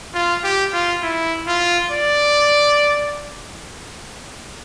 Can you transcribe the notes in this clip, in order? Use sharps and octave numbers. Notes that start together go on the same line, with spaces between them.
F4
G4
F4
E4
F4
D5